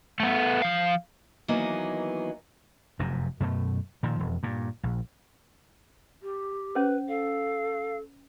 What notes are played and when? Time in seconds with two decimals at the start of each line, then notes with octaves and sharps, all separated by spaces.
0.20 A3 B3
0.62 F3 F5
1.48 D#3 E3 F#3 A#3 B3 D#5
2.99 F1 F#2 C3
3.40 F#2 B2 A3
4.03 A#2 D#3 F3
4.19 E1 F2
4.43 G2 A#2
4.83 A#1
6.22 G4
6.75 C#4 B4 C5
7.08 A4 F5